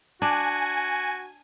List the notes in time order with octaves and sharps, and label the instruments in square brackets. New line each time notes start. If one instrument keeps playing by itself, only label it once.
[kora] D4 [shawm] F#4 [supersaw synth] G#5